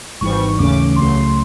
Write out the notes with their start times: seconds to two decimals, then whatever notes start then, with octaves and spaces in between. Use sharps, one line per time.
0.21 G#1 G#2 E3 G3 C#6
0.59 D#2 C#3 E3 A3 C#4 D6
0.96 C#2 C#3 F#3 A3 C6